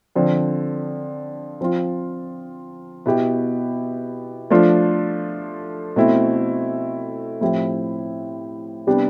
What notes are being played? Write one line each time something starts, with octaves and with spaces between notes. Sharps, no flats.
D3 F3 C4
F3 C4 F4
B2 B3 E4 G4
F3 A3 D4 F4
B2 A3 C4 E4
A2 F3 C4 E4 G4
C3 G3 B3 D4 G4